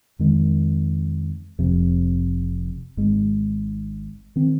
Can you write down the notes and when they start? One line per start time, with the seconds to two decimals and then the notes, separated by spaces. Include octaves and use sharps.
0.19 F2 D#3 G#3
1.59 F1 F2 C3
2.97 G#1 G#2 G#3
4.36 D#3 C4